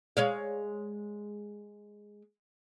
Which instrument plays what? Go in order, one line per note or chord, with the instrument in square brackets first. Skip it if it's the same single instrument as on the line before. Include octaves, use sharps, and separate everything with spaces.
[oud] G#3 C#5 F5